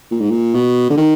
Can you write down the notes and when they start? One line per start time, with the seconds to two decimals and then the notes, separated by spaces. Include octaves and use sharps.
0.11 A#2
0.21 G#2
0.31 A#2
0.55 B2
0.90 D3
0.97 D#3